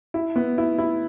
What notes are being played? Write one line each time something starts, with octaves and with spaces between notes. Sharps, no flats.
E4
B3
E4
E4